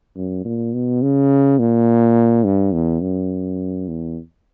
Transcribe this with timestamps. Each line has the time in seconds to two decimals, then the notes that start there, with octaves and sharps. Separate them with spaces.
0.17 F#2
0.45 A#2
0.74 B2
1.02 C#3
1.59 A#2
2.45 G2
2.74 E2
3.02 F#2
3.88 E2